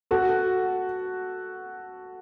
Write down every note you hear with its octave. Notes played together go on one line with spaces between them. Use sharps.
F#4 A4